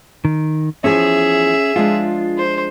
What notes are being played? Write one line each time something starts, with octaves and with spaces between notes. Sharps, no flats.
D#3
E2 F3 C#4 G#4 E5 G#5
F3 G#3 D4 F4
C5